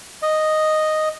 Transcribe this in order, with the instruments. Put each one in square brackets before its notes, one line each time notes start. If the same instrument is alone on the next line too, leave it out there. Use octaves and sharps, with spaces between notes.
[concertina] D#5